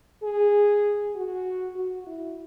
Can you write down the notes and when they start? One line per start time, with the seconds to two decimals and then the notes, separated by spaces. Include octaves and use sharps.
0.23 G#4
1.15 F#4
1.76 F#4
2.07 E4